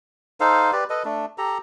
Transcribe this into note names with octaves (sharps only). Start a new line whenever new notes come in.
D#4 A4 C5 F5
G4 B4 D5
A4 B4 D#5
A3 D4
G4 A4 A#5